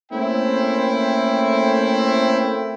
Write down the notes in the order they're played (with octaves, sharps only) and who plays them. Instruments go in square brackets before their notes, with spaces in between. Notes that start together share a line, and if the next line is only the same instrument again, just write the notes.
[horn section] A3 A#3 C4 C#4 E4 G5